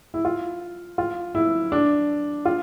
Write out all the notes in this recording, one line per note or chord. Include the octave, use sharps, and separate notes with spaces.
E4
F4
F4
E4
D4
F4